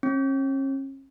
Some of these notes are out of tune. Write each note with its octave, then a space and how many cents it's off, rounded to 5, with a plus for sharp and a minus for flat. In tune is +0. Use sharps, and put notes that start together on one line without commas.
C#4 -40